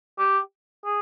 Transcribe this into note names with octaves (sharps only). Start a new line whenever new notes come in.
G4
G#4